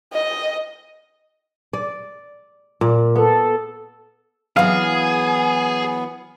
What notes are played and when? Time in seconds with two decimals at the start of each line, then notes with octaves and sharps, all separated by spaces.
0.14 D#5
1.73 D5
2.81 A#2
3.16 B3 A4
4.57 E3 F#3 B3 G#4 F5